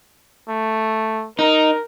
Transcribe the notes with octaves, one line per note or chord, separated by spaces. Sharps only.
A3
D#4 A#4